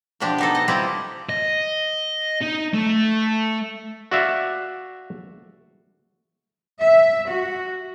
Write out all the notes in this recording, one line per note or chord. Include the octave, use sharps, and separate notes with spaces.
B2 D3 F3 D4 G4
B3 D#4 A4
D#5
G3 C4 E4 F4 G4 D#5
D#5
D#4
A3
F#4 D5 E5 F5
E5
F#4